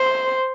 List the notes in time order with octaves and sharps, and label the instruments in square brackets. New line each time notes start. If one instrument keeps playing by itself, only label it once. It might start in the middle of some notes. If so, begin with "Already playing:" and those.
Already playing: [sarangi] C5